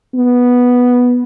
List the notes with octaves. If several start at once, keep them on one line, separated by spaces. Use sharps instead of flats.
B3